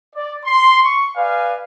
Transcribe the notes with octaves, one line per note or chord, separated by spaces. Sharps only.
D5
C6
C#6
B4 D5 F5 G#5